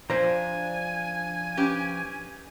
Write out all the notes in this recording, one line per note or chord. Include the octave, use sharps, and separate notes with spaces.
F3 D4 C5 G#5 A#5
C#4 G4 B4